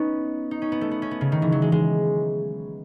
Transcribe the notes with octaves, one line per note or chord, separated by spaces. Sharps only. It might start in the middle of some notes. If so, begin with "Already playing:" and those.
Already playing: B3 C#4 D#4
D#4
C#4
B3
A3
B3
C#4
B3
C#3
D#3
E3
F#3
G#3
G#3